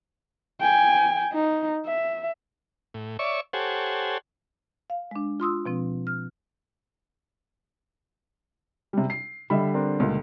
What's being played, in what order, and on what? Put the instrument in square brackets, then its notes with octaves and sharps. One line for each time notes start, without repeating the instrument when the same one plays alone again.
[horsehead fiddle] G5 G#5
D#4
E5
[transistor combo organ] A2
C#5 D5 E5 C#6
G4 A4 C5 C#5 F#5 G#5
[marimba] F5
G#3 D4
F4 C6 D#6 E6
B2 F3 C4
F6
[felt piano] C3 G3
C7
[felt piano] D3 G3 [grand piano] D#5 E5 B5
[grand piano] C4 D4 A#4
C#2 A#2 A#3